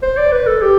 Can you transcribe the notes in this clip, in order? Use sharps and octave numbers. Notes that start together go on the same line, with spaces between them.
C5
D5
B4
A4
G4